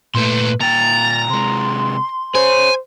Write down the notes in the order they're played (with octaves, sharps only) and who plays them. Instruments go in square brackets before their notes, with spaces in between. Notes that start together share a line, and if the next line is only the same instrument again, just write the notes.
[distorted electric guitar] A#2 A3 [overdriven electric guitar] B4 C6
[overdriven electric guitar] A#2 G5 [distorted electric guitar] A#5 [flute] A6
[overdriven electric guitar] C3 G#3 [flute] C6
[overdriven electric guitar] G#4 C#5 [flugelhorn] C5 [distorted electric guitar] G#5